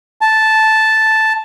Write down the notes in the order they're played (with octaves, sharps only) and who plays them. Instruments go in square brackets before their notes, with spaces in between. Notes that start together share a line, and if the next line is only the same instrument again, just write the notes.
[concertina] A5